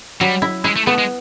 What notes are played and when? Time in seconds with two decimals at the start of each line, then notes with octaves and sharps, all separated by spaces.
0.20 F#3 G3
0.42 E4
0.64 G#3 E4
0.76 A3
0.87 A3 B3
0.98 G#3